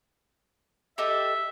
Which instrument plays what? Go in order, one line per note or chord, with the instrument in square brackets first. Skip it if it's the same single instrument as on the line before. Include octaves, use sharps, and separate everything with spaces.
[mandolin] G4 A4 D#5 [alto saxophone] E5